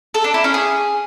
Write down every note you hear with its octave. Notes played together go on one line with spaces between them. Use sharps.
A4
D4
E4
C#4
G#4